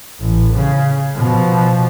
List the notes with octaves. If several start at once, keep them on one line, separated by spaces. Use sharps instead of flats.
A1
C#3
B2 F3